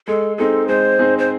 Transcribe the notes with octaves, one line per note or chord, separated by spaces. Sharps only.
G#3 A4
C4 D#4 G#4 A4
G#3 C5
C4 D#4 G#4
C5